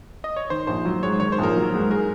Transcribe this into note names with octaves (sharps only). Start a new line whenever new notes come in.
D#5
C#5
D#3 C5
A#1 C5
F#3
G#2 C#5
D#3 C#5
C5
A#1 A#4
F#3
G#2
G#3 A#4